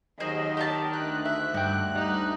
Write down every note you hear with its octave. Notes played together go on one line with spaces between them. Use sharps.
D#2 D#3 F#3 G#4 C5 D#5
G4 D5 A5
D2 G5 F#6
E5
G2 F#4 G5
G3 D#4